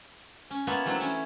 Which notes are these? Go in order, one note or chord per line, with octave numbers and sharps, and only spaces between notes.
C#4
A#3 B3 F4 C#5 E5
E3 F#3 A3 C4 D4
C#4 E4 C#5